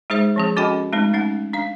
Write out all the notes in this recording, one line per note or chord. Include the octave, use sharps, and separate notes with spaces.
G#3 D#4 G#4 C5 E5
F3 C4 G#4
C#4 F#4 A4 D#5 G5 B5
G#3 A3 C4 D#4
A3 C#4 D#4 F#5
D4 F5